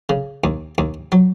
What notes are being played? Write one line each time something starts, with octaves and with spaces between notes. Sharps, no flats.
C#3
D#2
D#2
F#3